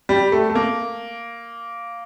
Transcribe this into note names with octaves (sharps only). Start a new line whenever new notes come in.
G3
A3
A3
A#3